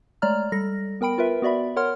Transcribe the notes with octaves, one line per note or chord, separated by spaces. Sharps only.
G#3 A3 C#5 D5 A#5 F6
G3 A4 A#6
B3 A#4 G5 B5 D7
F4 A#4 B4 E5
B3 F#4 D5 E5 B5
A#4 C#5 F#5 C6 F6